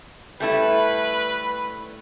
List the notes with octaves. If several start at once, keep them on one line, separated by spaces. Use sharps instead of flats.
G3 A3 E4 B4